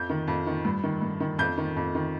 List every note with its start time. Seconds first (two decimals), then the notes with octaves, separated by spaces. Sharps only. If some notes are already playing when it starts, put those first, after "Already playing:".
Already playing: F2 G6
0.10 D#3
0.27 F2
0.47 D#3
0.65 G2
0.83 D#3
1.02 G2
1.20 D#3
1.39 F2 G6
1.58 D#3
1.76 F2
1.95 D#3